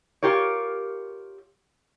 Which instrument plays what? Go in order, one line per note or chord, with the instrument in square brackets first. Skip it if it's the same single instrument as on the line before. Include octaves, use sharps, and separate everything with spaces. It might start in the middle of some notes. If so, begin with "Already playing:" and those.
[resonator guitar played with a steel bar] F4 G4 A#4 C#5